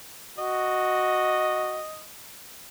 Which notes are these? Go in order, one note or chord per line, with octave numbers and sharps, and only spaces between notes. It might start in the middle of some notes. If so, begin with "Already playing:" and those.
F#4 D#5